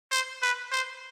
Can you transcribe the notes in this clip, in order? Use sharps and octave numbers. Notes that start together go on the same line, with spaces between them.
C5
B4
C5